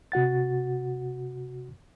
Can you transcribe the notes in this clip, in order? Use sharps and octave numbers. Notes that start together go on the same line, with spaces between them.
C3 F#4 F#5 A6